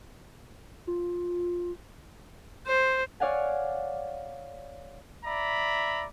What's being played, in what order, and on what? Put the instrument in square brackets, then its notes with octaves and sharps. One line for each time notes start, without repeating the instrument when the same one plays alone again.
[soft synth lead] F4
[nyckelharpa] C5
[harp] C#5 D5 F5 F#5 G#5
[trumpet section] D5 E5 A#5 B5